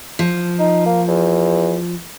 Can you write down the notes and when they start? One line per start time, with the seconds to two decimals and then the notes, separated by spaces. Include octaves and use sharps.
0.19 F3
0.60 D#4
0.86 A#3
1.08 E2